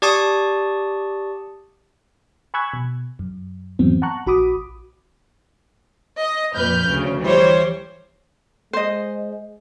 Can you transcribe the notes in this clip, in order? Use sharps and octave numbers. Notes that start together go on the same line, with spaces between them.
G4 D5 A5 C#6 D#6
G#5 B5 C#6 E6 F#6 G#6
B2
F#2
F2 G#2 E3 F#3 B3 C4
F#5 A5 A#5 C#6 F#6
A#1 F#4 B5 D6 D#6
D#5
F2 A#2 F3 B4 F6 G6
D2 C#3
E3 G3 C5 C#5
G#3 C5 D#5